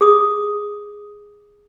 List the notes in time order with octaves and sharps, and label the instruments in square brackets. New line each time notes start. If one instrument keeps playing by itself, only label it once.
[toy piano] G#4 D#6